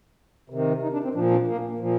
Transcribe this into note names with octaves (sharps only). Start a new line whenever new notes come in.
C3 D#3
D#4
D4
C4
A#2 F3 D4
D4
A#3
A#2 F3